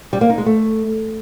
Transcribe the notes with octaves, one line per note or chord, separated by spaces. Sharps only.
G3
A#3
D#4
G#3
A3